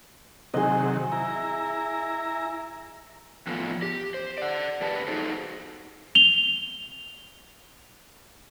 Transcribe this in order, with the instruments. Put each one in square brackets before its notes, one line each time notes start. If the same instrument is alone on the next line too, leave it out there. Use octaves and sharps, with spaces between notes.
[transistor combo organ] C3 D#3 F#3 [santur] G#4 D#5
[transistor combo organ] E4 A#5
[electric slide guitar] A2 E3 F3 B3
G4
C5
D5 F#5
E2 G4 B4 A5
D#4 F#4 G#4 A4 C5
[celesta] F7 G7